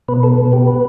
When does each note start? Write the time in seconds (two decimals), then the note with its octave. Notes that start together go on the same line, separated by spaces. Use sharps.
0.08 B2 B4
0.23 B3 A4
0.38 B2
0.52 B3 G4
0.67 B4